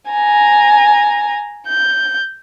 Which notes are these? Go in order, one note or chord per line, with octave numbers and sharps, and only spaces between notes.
G#5 A#5
G6